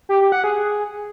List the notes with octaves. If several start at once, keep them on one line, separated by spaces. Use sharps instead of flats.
G4
G4
F#5
G#4